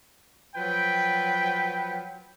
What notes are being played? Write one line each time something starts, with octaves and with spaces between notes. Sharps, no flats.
F3 F#3 B4 G5